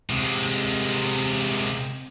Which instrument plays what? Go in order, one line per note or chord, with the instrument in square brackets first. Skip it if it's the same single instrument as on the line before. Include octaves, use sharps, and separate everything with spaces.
[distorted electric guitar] C3 G#3